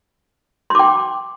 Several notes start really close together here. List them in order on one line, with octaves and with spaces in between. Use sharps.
C6 D6 G5